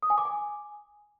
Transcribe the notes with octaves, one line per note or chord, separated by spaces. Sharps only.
D#6
G#5
D6
G#5